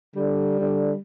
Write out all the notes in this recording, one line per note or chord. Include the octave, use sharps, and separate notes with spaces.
D3 G3
D3